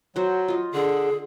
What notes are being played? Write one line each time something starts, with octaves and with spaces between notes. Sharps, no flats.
F#3 F#4 C5
F4 D#5
D3 G#4